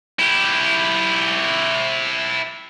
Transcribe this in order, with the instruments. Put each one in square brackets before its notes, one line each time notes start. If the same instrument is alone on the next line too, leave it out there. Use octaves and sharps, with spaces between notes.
[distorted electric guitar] E4 G4